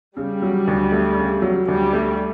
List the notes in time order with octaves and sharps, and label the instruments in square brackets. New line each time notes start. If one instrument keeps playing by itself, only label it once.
[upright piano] C#3 [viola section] G3
[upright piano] F#3
D2
A3
C#3
F#3
[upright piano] D2 [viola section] G3
[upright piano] A3